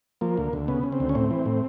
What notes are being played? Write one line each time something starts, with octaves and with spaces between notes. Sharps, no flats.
F3 A#3
D2
D2
C#3 B3
C#3
C4
D2
C#4
A2 C4
E3
A2